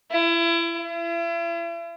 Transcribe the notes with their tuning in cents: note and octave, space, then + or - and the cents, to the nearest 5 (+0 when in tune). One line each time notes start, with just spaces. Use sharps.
E4 +30
E4 +40